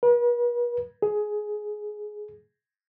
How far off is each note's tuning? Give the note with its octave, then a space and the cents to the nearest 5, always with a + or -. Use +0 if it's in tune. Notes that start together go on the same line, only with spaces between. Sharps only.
B4 -45
G#4 +15